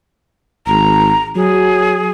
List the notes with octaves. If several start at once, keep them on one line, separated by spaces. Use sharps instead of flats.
G#1 A#5
F#3 G#4